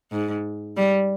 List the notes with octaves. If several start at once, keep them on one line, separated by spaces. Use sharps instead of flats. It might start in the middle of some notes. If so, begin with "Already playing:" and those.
G#2
G3